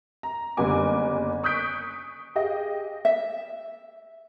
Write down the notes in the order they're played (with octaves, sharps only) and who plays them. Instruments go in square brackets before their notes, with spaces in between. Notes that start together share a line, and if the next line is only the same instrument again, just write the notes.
[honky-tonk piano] A#5
F#1 D3 G3 B3 G#5 D6
C#6 D#6 F#6 G6 B6 D7
G4 G#4 D#5 F5
[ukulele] E5